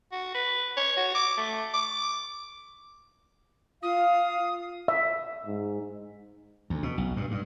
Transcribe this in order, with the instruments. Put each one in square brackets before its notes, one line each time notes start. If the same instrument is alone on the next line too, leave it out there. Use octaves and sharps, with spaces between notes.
[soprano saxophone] F#4
B4
C#5
F#4
D6
A3
D6
[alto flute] F4 [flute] F5 [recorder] D#6
[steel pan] E5
[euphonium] G#2
[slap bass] D2
B2
B1
G2
G2